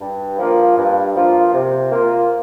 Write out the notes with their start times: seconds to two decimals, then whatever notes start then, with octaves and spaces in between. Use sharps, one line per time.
0.01 G2
0.38 F3 A#3 F4
0.77 G2
1.16 F3 A#3 F4
1.54 C3
1.92 A#3 F4